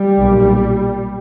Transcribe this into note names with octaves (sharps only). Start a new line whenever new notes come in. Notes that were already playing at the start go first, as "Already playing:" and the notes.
Already playing: G3
B1 A#2